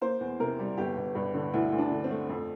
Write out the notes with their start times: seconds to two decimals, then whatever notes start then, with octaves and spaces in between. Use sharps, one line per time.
0.01 A#3 C5
0.21 E2
0.40 C3 A#4
0.59 G3
0.77 G1 G4
0.97 G1
1.15 G2
1.34 D3
1.53 D2 E4
1.72 D2
1.78 D4
1.91 D3
2.04 C4
2.11 A3
2.29 F2